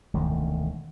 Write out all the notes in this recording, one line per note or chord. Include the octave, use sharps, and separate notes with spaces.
E1 D2 D3 D#3